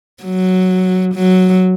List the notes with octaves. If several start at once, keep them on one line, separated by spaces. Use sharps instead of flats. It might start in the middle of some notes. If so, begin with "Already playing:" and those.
F#3
F#3